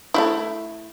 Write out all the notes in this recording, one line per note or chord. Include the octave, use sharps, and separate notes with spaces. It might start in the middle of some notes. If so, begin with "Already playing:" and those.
A3 D#4 E4